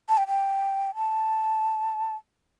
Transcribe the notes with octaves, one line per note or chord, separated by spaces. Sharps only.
A5
G5
G5
A5